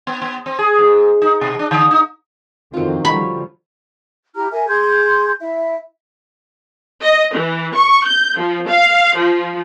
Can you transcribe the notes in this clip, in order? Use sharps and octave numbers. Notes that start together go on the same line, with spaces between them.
B3
B3
C4
G#4
G#2
D#4
B2
D4
D3
D#4
F2 D3 D#3 F#3 C4 F4
D3 F3 G3 C#5 B5
E4 G4 A#5 F6
A#4 E5 G#5
G#4 C6 G6 G#6
E4 E5
D#5
E3
C#6
G6
F3
F5
F3